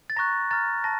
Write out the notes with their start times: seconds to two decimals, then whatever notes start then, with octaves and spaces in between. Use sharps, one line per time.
0.10 A6
0.16 A#5 C#6 F#6 A#6
0.51 A#5 F6 A6
0.84 A5 A#6